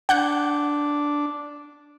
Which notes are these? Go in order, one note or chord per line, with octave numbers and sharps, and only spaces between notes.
D4 F#5 F#6 G6